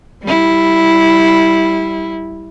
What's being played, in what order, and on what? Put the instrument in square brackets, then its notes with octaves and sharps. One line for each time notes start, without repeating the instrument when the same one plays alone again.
[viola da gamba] G3 E4